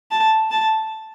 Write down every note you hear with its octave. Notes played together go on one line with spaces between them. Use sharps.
A5
A5